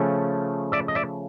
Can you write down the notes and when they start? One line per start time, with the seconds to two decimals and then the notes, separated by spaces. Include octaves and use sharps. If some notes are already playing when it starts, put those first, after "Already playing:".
Already playing: C#3 F3 A3 C#4
0.72 D5 E5
0.88 D#5
0.95 D5 E5